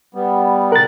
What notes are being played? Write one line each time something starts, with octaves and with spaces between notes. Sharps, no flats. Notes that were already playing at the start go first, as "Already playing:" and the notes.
G3 B3
A#4 F#6 A6